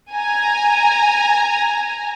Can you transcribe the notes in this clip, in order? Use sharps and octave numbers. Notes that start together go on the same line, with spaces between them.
G#5 A#5